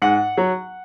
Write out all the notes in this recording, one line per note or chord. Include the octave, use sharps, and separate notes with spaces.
G#2 F#5
F#3